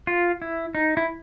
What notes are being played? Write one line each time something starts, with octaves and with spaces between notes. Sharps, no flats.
F4
E4
D#4
E4